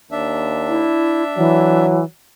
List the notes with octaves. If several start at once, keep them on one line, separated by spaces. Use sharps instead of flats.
D#2 D4 E5
E4
E3 F#3